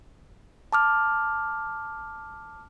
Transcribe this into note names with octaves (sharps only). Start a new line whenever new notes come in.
A5 D6 F6